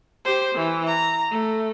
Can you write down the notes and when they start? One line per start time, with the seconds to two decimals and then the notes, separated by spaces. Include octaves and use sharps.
0.25 G4 C5
0.55 E3
0.87 A#5
1.31 A3